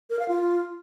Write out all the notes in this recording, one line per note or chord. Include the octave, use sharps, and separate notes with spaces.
A#4
F5
F4